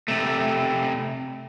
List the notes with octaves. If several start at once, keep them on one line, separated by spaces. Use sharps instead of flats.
C3 A3